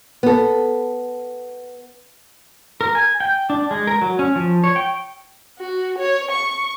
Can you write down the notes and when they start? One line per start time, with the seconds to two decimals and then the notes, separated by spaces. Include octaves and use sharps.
0.23 B3 A4
2.81 A#4
2.95 G#5
3.20 G5
3.50 D4
3.71 G#3
3.87 A#4
4.02 F#3
4.19 C#4
4.35 F3
4.64 C#5
4.76 G5
5.58 F#4
5.98 C#5
6.31 C#6